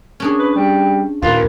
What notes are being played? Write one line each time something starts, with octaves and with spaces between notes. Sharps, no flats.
C#4 D4 G#4
B4
G3
D#2 A#2 F4 B4